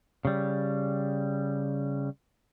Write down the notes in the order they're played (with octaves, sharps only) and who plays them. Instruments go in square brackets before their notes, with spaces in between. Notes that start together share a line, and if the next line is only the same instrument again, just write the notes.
[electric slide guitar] C#3 G3